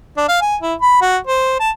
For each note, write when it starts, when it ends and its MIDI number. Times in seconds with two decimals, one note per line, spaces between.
0.17 0.24 62
0.28 0.39 77
0.42 0.56 80
0.61 0.74 64
0.81 0.99 83
1.01 1.17 66
1.27 1.58 72
1.60 1.70 81